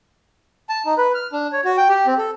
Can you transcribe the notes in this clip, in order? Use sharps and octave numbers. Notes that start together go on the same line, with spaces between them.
A5
D#4
B4
F6
D4
C#5
F#4
G5
G4
C4
A4